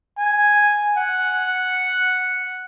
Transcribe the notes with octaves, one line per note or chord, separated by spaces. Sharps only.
G#5
F#5